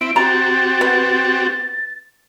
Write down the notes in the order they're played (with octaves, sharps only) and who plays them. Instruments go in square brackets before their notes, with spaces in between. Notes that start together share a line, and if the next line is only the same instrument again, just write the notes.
[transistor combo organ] C4 E4 [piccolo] D7
[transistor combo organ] C4 F#4 G4 [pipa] A#5 [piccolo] A6
[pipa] B3